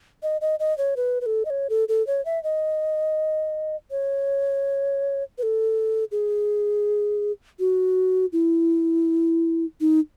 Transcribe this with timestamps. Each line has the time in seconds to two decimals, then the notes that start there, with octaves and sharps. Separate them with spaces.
0.23 D#5
0.41 D#5
0.60 D#5
0.78 C#5
0.97 B4
1.21 B4
1.26 A4
1.45 D#5
1.50 C#5
1.70 A4
1.89 A4
2.07 C#5
2.25 E5
2.43 D#5
3.91 C#5
5.38 B4
5.43 A4
6.12 G#4
7.59 F#4
8.33 E4
9.81 D#4